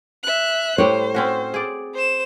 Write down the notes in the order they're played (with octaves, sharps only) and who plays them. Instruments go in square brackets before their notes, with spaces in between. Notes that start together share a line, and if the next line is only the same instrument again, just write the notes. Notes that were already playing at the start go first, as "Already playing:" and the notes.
[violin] E5 F#6
[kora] A2 G3 [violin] C5 [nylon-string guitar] C#5
[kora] C4 C#4 F#4
G#4 D5
[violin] C5 E7